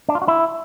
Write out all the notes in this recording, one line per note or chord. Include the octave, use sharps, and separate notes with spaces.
D4
F4
F#4
E4